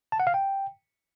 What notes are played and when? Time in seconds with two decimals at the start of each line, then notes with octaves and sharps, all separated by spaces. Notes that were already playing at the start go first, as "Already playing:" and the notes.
0.12 A5
0.20 F#5
0.27 F5
0.34 G5